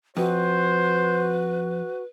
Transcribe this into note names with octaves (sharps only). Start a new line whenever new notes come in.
F2 F#4 B4 C5